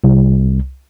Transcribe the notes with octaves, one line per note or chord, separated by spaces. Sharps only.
C2